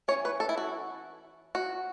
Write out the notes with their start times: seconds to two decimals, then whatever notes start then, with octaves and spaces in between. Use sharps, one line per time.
0.08 E3 C#4 C#5
0.25 B4
0.40 A4
0.49 E4
0.57 F#4
1.55 F#4